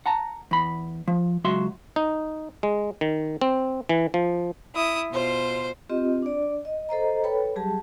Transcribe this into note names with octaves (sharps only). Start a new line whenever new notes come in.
F#5 A5 A#5
E2 B5
F3
C#2 F#3 F#4 E5 C6
D#4
G#3
D#3
C4
E3
F3
E4 D#6
B2 F4 C5
C4 F4 G4 D#5
D4 D5
D#5
A4 C5 D#5 A#5
A4 B4 C#5 G5 B5
F#3 G3 G4 G#4 A5